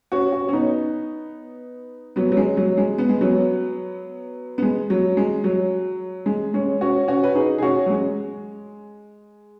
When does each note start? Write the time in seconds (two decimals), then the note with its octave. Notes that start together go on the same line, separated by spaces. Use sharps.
0.12 C#4 F#4
0.32 C#4 F#4
0.49 C#4
0.53 B3 D#4
2.16 F#3 B3
2.32 F#3
2.37 G#3
2.57 F#3
2.77 G#3
2.98 B3
3.09 G#3
3.21 F#3 B3
4.58 B3
4.62 G#3
4.90 F#3
5.17 G#3
5.44 F#3
6.26 G#3
6.54 G#3 C#4
6.81 C#4 F#4
7.08 C#4 F#4
7.24 B4
7.35 D#4 G#4
7.58 G#4
7.62 C#4 F#4
7.86 F#3
7.90 G#3